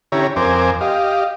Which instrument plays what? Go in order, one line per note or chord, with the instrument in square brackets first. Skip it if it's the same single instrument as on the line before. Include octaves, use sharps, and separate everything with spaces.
[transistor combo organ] D3 C#4 E4 G4 C#5 A#5
F2 C4 A#4 C5 G#5 D6
G4 D#5 F5